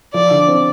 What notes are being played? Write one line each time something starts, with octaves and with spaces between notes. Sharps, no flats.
F3 D5
D3
C4